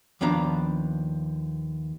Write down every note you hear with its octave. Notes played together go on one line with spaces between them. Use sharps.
D#2 F3 B3 D4 A#5